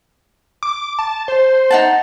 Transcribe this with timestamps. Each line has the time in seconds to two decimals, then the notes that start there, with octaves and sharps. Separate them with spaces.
0.63 D6
0.99 A5
1.28 C5
1.70 D#4 F#5 A5